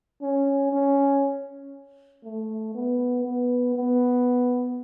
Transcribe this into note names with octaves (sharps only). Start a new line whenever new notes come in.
C#4
C#4
A3
B3
B3
B3